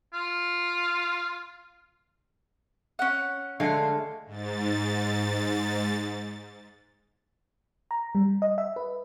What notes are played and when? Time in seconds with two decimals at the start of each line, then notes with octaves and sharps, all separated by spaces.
0.13 F4
2.99 C#4 F#5
3.60 D3 G#3 A3 F5
4.26 G#2 A6
7.91 A#5
8.15 G3
8.42 D#5
8.58 E5
8.76 B4